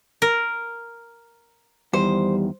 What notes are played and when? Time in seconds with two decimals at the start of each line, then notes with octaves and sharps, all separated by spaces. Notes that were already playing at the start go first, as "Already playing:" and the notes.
0.22 A#4
1.93 E2 D#3 G3 C5